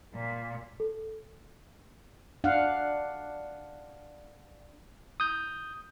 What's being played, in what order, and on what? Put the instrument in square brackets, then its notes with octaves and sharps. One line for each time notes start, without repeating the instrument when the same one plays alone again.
[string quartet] A#2
[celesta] A4
[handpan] D4 F5 F#5
[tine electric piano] D#6 G6